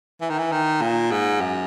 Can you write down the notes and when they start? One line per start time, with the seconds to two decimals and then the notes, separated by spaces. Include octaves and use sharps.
0.21 E3
0.30 D#3
0.39 E3
0.52 D#3
0.81 A#2
1.11 G#2
1.41 F#2